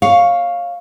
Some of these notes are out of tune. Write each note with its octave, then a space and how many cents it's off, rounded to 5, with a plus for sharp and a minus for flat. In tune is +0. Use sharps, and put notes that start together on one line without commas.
C#5 +0 F5 +5